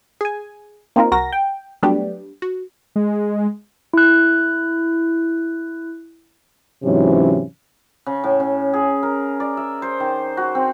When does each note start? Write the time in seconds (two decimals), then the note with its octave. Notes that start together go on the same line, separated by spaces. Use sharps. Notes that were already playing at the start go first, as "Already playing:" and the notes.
0.21 G#4 G#5
0.96 A#3 C4 D#4 F4 A#4
1.12 C2 F#4 A#4 A#6
1.33 G5
1.83 F#3 G3 A3 B3 D4 G4
2.42 F#4
2.96 G#3
3.93 E4 F#6
6.83 G#2 C3 E3 F#3 C#4
8.06 C#3
8.24 A2
8.40 C#3
8.73 G#4
9.03 A#4
9.40 D5
9.57 E5
9.82 C5
10.00 D#3
10.37 F#4
10.55 C4